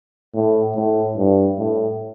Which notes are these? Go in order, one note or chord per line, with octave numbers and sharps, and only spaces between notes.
A2
A2
G2
A2